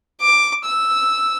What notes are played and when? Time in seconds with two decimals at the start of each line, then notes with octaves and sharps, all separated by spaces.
0.21 D6
0.65 E6